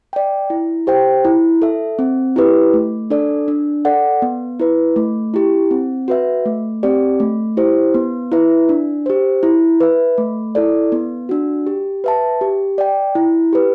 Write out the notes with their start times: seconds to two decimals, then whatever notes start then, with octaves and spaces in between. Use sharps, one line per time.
0.13 D5 G5
0.50 E4
0.87 G4 C5 G5
1.25 E4
1.62 A4 E5
1.99 C4
2.36 E4 G4 B4
2.74 A3
3.10 D4 A4 D5
3.48 D4
3.85 A4 D5 F#5
4.22 B3
4.60 E4 B4
4.96 A3
5.34 E4 G4
5.71 C4
6.08 F#4 B4 E5
6.46 A3
6.83 C4 G4 D5
7.20 A3
7.57 E4 G4 C5
7.94 B3
8.32 E4 B4 E5
8.69 D4
9.06 G4 C5
9.43 E4
9.80 B4 E5
10.18 A3
10.55 E4 A4 D5
10.92 B3
11.29 D4 F#4
11.67 G4
12.04 B4 E5 A5
12.41 G4
12.78 D5 G5
13.15 E4
13.53 G4 B4